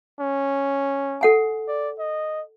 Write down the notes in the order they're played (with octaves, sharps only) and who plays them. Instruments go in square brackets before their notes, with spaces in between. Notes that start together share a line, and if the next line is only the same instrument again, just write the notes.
[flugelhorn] C#4
[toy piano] A4 F#5 G#5
[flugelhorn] D5
D#5